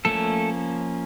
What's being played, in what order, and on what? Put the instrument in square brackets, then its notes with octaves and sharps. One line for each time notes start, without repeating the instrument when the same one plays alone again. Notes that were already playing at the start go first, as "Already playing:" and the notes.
[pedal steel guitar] F3 A3 A#3 C#4 A4